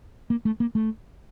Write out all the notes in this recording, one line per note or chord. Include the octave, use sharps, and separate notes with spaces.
A#3
A3
A#3
A3